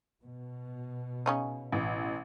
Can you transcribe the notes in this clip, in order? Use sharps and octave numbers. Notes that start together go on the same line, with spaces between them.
B2
C#3 C#4 D#4
A1